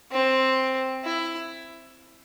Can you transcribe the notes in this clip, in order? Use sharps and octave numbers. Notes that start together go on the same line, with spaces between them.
C4
E4